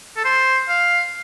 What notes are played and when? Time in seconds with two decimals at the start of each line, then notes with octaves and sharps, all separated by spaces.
0.16 A4
0.24 C5
0.69 F5